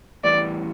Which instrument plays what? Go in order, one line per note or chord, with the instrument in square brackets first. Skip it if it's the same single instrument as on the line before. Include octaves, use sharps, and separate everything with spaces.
[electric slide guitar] A2 E3 G3 B3 [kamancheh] D5